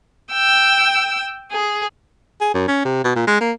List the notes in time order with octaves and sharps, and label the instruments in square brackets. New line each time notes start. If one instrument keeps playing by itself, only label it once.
[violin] G5 E6
G#4
[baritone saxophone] G#4
F#2
C#4
C3
B2
A#2
G#3
A#3